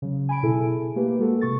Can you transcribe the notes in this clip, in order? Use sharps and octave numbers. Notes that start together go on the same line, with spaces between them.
C#3 F#3
G#5 B5 D7
B2 E4 G#4 A4
A3 A#3 G4 B4
G#3 A#3 F#4 A4
C3 C#6 A6